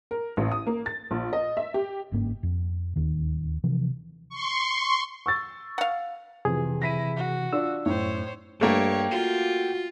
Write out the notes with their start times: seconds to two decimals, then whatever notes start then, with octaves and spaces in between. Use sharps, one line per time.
0.11 A#4
0.37 A1
0.52 D#6
0.67 A#3
0.86 A6
1.11 A#1
1.33 D#5
1.57 E5
1.74 G4
2.12 G1 G#2 A#3 C#4
2.43 F2
2.96 D1 D#2 D#3
3.64 C3 E3 F3
4.29 C6 C#6
5.26 C#6 E6 A6
5.78 F5 F#5
6.45 F2 C3 E3 G#4
6.82 E4 A#6 B6 D#7
7.17 F#4
7.53 D4 F4 E6
7.86 F#2 A2 C5 C#5
8.61 G2 A3 A#3 G4 C#5
9.11 F4 F#4